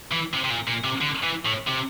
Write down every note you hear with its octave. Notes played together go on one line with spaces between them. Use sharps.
E3
C3
C3
A#2
A#2
C3
D3
E3
A2
C3